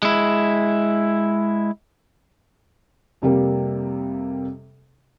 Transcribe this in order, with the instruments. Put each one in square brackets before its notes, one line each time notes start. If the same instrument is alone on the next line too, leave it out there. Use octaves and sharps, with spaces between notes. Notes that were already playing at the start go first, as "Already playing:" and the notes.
[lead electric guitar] G#3 E4
[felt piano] F2 C3 G3 A#3